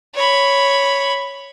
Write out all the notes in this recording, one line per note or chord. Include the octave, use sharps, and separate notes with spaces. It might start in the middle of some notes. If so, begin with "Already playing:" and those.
C#5 B5